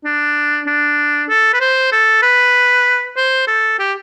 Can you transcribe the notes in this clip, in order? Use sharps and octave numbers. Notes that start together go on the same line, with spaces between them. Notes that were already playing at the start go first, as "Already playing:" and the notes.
D4
D4
A4
B4
C5
A4
B4
C5
A4
G4